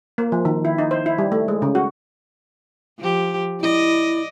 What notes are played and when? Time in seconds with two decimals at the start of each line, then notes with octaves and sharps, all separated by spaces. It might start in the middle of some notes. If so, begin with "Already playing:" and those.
0.18 A#3
0.32 F3
0.45 D#3
0.65 E4
0.78 D#4
0.91 C5
1.06 E4
1.18 G3
1.32 A3
1.48 G#3
1.62 C#3
1.75 F#4
2.99 F3 G4
3.61 E4 D5 D#5